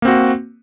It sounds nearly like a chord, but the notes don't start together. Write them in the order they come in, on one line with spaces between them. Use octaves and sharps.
A#3 C4 F#4